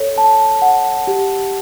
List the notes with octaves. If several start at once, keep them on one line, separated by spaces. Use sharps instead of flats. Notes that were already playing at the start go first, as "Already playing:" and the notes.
Already playing: A4 C#5
A5
F#5
G4